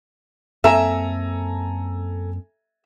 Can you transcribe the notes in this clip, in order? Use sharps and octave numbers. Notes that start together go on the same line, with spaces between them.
F#2 A#3 C4 A4 E5 G#5 A#5